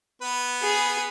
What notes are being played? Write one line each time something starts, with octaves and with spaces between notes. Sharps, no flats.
B3 B4
G#4